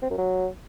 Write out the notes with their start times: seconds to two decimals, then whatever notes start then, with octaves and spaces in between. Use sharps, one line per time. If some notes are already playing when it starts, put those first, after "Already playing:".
0.03 C4
0.10 F#2
0.18 F#3